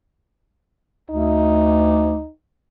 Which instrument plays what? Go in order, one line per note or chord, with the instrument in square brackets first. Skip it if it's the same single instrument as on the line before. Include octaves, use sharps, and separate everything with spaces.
[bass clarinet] D2 [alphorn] D#4